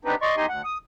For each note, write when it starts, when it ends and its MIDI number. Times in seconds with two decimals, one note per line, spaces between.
0.05 0.15 59
0.05 0.15 60
0.05 0.15 62
0.05 0.15 63
0.05 0.15 67
0.05 0.15 71
0.22 0.36 74
0.22 0.36 75
0.22 0.36 84
0.22 0.36 85
0.37 0.46 40
0.37 0.46 63
0.37 0.46 67
0.37 0.46 75
0.37 0.46 80
0.37 0.46 84
0.49 0.62 38
0.49 0.62 78
0.64 0.78 87